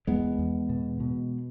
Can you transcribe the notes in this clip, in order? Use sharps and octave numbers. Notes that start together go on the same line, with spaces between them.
E2 G#3 B3
E2
B2
B2